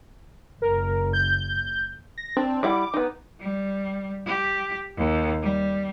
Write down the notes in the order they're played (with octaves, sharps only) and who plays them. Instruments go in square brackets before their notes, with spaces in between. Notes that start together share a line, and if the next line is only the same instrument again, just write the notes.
[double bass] F#1 [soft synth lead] A#4
[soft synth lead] G6
[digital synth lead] A#6
[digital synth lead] C4 [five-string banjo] D4
[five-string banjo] G3 E4 F#5 [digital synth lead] D6
[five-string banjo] B3 D#4
[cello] G3
G4
D#2
G3